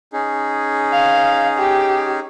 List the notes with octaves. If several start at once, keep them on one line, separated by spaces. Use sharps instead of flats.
C#4 D#4 G#4
F5
G4